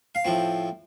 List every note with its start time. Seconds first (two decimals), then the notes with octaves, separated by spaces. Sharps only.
0.15 F5
0.25 A2 F3 C4